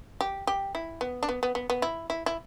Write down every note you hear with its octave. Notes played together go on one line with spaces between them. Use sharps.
G4
G4
E4
B3
D4
B3
B3
B3
B3
E4
E4
E4